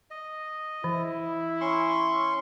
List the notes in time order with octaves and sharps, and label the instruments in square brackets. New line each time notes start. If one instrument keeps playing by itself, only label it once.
[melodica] D#5
[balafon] E3 [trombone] E4
[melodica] C#4 C6 C#6